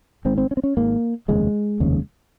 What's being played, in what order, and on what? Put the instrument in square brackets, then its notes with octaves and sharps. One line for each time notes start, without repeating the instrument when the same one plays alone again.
[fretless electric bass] G#1 G#2 C4
C4
C#4
C4
C#4
G#1 G#2 A#3
F1 D#2 C#3 G#3
F1 D#2 C#3